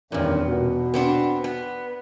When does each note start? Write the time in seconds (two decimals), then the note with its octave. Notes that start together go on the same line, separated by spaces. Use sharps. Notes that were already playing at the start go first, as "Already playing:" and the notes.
0.12 E2 G2 A#2 D#3 C#4
0.47 B2 F#4
0.94 B3 C4 D4
1.44 B3